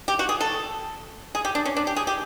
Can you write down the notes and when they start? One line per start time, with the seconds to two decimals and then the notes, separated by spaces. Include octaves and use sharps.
0.08 G4
0.19 F#4
0.29 G#4
0.41 A4
1.35 G#4
1.45 G4
1.55 D4
1.65 C#4
1.77 D4
1.87 G4
1.96 G#4
2.07 G4